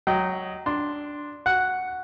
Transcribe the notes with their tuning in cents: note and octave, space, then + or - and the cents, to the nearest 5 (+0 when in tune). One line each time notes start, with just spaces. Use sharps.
F#3 +0 D#5 +5 G5 -25
D4 +0 C6 +0
F#4 +0 F#5 +0